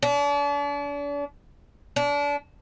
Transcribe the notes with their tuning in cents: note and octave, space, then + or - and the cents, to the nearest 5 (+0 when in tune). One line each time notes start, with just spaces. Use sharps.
D4 -40
D4 -30